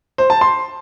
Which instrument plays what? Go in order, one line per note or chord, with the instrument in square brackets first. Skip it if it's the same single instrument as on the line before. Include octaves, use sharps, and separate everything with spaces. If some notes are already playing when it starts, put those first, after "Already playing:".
[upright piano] C5
A5
C6